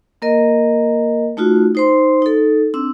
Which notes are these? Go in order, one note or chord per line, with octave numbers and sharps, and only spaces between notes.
A#3 A#4 D#5
A3 D#4 F4 F#4
D#4 C5 C6
D#4 A4
C4 D4 E6